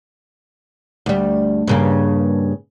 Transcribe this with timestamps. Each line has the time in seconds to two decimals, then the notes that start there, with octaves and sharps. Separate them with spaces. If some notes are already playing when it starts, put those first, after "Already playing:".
1.06 D2 G3
1.68 G2 C#3 A#3